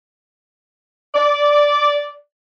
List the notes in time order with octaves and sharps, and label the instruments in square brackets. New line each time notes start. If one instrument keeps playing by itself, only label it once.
[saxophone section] D5